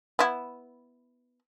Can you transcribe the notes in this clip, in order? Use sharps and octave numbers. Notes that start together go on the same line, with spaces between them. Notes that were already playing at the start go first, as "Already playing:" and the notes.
B3 E4